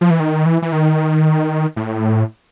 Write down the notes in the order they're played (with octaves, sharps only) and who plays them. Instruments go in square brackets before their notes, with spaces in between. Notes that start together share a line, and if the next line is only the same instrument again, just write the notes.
[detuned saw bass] F3
E3
D#3
E3
E3
D#3
A2